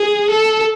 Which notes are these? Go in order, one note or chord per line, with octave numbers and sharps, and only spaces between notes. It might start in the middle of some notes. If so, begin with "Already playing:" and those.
Already playing: G#4
A4